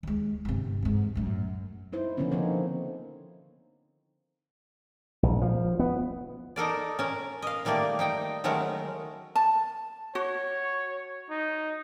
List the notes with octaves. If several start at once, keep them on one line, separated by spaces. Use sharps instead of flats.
D#2 G#3
G1 C3
E2 G#2
F#2 A2
D#4 E4 C5
D3 D#3 F3 A#3 B3 C#4
D3 F3 C4 D#4 C#5
A#1
F3
B3
D#4 A4 A#4 D5
C#4 A#4
D#5 F5
D#3 G3 A3 A#3 D5
G3 D#4 G5
D#3 F#3 G#3 A3 C#4 A#4
A5
F#4 C#5
D#4